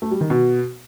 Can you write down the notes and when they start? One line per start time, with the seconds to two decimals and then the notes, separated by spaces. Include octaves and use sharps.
0.02 A3
0.11 G3
0.21 D#3
0.30 B2